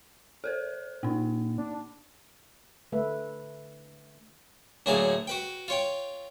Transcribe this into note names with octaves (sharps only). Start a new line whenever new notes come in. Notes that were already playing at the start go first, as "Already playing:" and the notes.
A4 A#4 C5
A#2 A#3 D#4
D4
D3 A3 B4 E5
D2 A2 F#3 A#3 G#4 A5
F#4 B4 G5
F4 C#5 G5